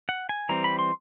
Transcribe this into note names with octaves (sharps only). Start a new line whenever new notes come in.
F#5
G#5
E3 G3 C4 A#5
B5
C6